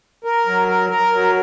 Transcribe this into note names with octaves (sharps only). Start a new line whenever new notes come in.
A#4
F#3
A#4
A#4
F#3